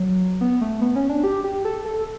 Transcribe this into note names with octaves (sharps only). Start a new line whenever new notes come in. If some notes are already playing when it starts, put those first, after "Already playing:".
Already playing: F#3
B3
A3
B3
C#4
D4
G4
G4
A4
A4